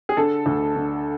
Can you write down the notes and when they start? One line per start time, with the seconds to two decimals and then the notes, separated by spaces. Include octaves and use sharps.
0.09 G#4
0.17 D3 A4
0.46 D2
0.76 D3